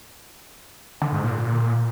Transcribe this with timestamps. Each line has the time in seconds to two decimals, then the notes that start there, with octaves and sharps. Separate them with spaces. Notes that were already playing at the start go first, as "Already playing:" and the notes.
1.02 D3
1.13 G#2
1.24 A#2